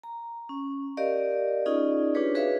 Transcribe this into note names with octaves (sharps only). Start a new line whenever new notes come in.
A#5
C#4
G4 A#4 D5 D#5 F5
C#4 D#4 F4 G#4 D5 D#5
D4 F4 G4 G#4 B4 C#5
F#4 G#4 B4 C#5 E5 F5